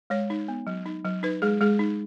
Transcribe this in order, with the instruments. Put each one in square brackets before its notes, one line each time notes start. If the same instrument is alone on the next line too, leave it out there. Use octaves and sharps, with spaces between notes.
[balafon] G#3 C#5
D#4
B3
F#3
D#4
F#3
D#4 B4
G#3 G#4
G#3 G#4
D#4